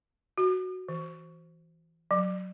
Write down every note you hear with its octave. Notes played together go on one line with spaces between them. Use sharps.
F#4
E3
F#3